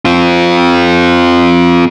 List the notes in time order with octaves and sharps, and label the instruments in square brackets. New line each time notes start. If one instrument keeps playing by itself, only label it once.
[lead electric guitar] C4 F4